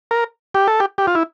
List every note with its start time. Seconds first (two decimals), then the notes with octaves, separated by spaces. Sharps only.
0.11 A#4
0.54 G4
0.68 A4
0.80 G4
0.98 G4
1.07 F4
1.15 E4